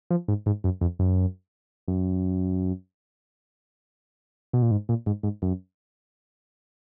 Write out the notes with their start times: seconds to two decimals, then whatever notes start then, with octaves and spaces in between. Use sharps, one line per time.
0.10 F3
0.28 G#2
0.46 G#2
0.64 F#2
0.81 F2
0.99 F#2
1.88 F#2
4.53 B2
4.62 A#2
4.71 G#2
4.89 A#2
5.06 G#2
5.23 G#2
5.42 F#2